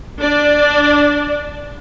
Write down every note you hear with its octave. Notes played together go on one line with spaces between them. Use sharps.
D4 D5